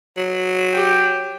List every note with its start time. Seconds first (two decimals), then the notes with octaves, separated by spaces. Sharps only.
0.17 F#3
0.73 G4 G5